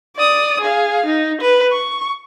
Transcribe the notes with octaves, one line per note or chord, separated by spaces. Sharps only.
D5 D#6
G#4 F5
D#4
B4
C#6